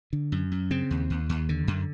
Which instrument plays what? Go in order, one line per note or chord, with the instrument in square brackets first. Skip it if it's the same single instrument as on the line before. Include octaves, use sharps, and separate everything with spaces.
[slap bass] D3
F#2
F#2
C#3 C4
D#2
D#2
D#2
D3
F#2